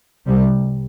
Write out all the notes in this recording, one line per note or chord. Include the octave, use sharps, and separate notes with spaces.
C2 C3 G3